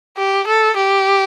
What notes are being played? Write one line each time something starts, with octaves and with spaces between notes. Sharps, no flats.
G4
A4
G4